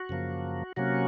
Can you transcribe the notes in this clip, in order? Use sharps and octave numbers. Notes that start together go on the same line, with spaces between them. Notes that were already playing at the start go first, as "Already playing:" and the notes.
Already playing: F#4
F#2 C#3 F3 A#3
C3 F#3 A#3 C#4 F#4